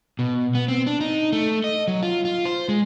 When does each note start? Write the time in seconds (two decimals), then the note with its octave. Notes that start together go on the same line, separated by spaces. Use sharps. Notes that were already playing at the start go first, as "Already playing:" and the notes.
0.19 B2
0.55 B3
0.68 C4
0.87 D4
1.01 D#4
1.32 A3
1.64 D#5
1.88 F#3
2.03 F4
2.25 F4
2.46 C5
2.69 G#3